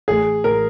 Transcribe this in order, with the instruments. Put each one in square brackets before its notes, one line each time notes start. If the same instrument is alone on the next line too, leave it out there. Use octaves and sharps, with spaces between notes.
[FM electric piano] A1 A2 E3 A3 [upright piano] G#4
[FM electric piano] A2 E3 A3 [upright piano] A#4